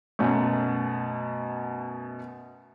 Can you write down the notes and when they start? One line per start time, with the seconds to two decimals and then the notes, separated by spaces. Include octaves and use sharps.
0.19 F#2 B2 A3